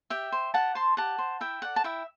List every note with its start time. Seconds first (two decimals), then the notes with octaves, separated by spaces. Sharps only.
0.10 G4 E5 G5
0.32 C5
0.54 G4 F#5 A5
0.75 C5 A5 C6
0.97 G4 F#5 A5
1.18 C5
1.40 E4 E5 G5
1.62 A4 D5 F#5
1.76 A5
1.84 E4 E5 G5